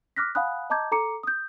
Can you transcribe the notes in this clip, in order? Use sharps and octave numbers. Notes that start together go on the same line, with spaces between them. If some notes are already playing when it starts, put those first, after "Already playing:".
D6 F6 F#6 A#6 B6
F5 F#5 G#5 B5 D#6 F#6
D#5 A5 A#5 D6 G6 G#6
A4 A#5 D6 C#7
D#6 G6